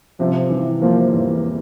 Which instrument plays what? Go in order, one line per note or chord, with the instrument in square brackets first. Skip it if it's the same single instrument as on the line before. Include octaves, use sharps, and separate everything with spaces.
[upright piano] C3 [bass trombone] F3
[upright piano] E3
[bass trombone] F3 [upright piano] A#3
[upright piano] E2